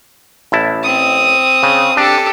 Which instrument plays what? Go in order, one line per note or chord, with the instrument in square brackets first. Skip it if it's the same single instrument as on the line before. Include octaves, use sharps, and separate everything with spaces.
[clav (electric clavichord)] A1 E4 A5
[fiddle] C4 D#6
[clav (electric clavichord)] C#3
[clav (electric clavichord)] D4 [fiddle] G4 A4